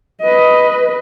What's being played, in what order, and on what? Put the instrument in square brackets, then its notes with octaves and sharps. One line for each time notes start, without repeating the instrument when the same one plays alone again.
[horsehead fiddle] B4 D#5